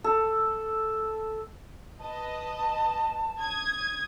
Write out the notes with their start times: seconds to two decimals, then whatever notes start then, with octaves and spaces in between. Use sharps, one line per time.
0.04 A4
1.99 B4 D#5 A5
3.40 D#6 G#6